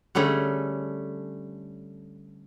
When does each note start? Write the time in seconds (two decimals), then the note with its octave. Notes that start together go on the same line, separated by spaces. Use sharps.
0.15 D3 G3 A3 C#4 G#4